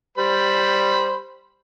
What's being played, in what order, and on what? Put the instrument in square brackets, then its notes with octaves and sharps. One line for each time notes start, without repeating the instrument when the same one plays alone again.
[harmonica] G3 C5 B5